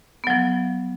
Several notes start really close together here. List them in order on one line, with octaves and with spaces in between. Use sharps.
B3 F#3 F3